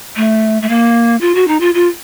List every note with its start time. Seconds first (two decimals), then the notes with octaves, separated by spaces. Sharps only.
0.16 A3
0.62 A3
0.69 A#3
1.21 F4
1.35 F#4
1.48 D#4
1.60 F4
1.74 F4